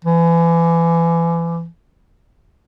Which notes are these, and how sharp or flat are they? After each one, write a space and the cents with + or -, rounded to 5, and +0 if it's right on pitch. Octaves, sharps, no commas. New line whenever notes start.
E3 +30